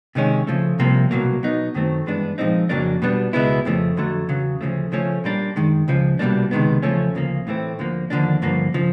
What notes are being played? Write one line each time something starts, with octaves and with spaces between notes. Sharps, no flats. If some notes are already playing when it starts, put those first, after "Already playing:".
C3 D#3 G#3 C#4
C#3 F3 A3
C2 C3 F3 A#3
C2 B2 F#3 A#3
B2 F#3 B3 D#4
F#2 D#3 F#3 A3 C4
G2 E3 G#3 B3 D4
A#2 F3 G#3 C4 D#4
F2 C#3 F#3 A#3 D4
B2 G3 B3 D4
C#2 B2 G#3 B3 E4
F2 C#3 F3 A3
F2 D3 F#3 A3
E2 C#3 F#3
D2 C#3 F3 A3
C#3 F3 A3 C#4
A#2 G3 A#3 D4
F#2 D#3 G#3
C#2 C#3 F3
C2 B2 G3 A#3 D4
C#2 C3 D#3 G#3 B3
E2 C#3 F3 A3 C#4
D2 C#3 F3 A#3
A2 E3 A3 C4
D2 D3 F3 A#3
D#2 D3 F3 A#3 D4
G2 D3 F3 A#3
C#3 F3